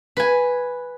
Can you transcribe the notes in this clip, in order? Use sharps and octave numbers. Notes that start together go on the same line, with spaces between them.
B4 G#5